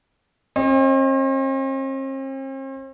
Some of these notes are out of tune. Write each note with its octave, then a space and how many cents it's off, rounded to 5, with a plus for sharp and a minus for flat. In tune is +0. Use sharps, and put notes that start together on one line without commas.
C4 +45 D#5 +0